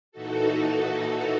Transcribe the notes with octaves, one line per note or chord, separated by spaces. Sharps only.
A#2 E3 D#4 F#4 A4